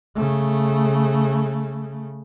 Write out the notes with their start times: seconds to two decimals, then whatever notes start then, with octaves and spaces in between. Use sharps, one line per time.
0.16 C#3 A3